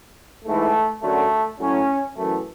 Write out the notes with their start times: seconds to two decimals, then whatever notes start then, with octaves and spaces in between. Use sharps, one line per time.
0.45 G#2 E3 A3
1.01 F#2 D3 F#3 A3
1.59 A2 F#3 C#4
2.16 F#2 E3 A3